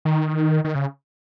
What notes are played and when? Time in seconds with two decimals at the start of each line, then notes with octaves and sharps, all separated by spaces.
0.05 D#3
0.64 D#3
0.75 C#3